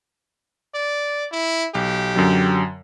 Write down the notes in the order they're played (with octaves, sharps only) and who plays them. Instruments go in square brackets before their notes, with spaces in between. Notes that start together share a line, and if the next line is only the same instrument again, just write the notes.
[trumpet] D5
E4
[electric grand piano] B1 [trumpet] G4
[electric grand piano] F#2 D3 F#3